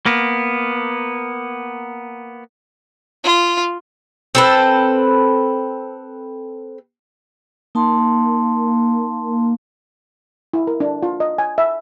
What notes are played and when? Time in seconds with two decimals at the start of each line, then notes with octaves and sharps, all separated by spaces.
0.06 A#3 B3
3.24 F4
4.35 C4 A4 B4
7.75 A#3 D#4 A5 C6
10.53 E4
10.67 A#4
10.80 D4
11.03 F4
11.20 D#5
11.38 G#5
11.58 E5